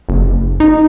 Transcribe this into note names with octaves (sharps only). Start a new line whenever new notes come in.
F#1
D#4